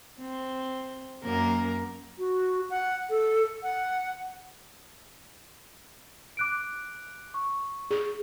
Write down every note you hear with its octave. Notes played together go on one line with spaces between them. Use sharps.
C4
F#2 A#3 A#4
F#4
F#5
A4
F#5
D6 F#6 D7
C#6
G#4